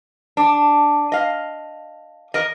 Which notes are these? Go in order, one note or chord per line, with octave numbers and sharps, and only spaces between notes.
D4
D#5 F5
A#4 D#5